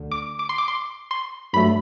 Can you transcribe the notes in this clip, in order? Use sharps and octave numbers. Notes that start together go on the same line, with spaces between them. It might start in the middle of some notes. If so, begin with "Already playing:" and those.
Already playing: D2 D3
D6
D6
C6
D6
C6
C6
G2 F#3 A3 B5